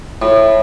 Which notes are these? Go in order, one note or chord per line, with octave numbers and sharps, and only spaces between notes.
A2